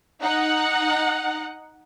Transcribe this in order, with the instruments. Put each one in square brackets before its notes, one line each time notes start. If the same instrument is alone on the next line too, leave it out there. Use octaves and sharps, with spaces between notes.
[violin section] D#4 F#5